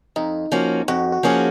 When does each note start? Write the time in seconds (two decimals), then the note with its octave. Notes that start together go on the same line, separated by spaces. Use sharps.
0.16 F2 D#4
0.52 F3 A#3 C#4 F#4
0.88 F2 F#4
1.12 F#4
1.23 F3 A#3 C#4 F#4 G#4